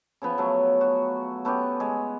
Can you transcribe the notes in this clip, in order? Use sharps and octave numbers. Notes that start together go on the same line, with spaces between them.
C#3 F3 B3
C#3 F#3 A3 F#4
F#4
A3 B3 C#4 G4
G#3